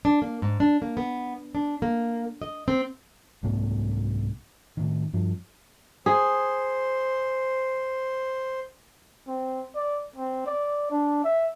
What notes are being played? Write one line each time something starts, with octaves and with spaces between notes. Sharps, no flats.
D4
A#3
G#2
D4
A#3
B3
D4
A#3
D#5
C4
C2 G#2 A3 B3
A2 D#3
G2 F3
G#4 C5
C4
D5
C4
D5
D4
E5